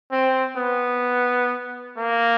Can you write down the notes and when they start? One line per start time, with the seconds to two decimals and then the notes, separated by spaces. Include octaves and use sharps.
0.12 C4
0.57 B3
1.98 A#3